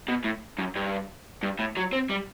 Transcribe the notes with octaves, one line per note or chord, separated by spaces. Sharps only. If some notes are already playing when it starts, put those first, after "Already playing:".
B2
A2
F#2
G2
G2
A2
F#3
C4
G3